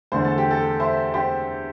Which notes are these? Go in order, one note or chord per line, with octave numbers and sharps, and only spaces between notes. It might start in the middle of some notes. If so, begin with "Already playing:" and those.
E2 D3 A3 C5
A4
G4
A4
C5 E5
G4 C5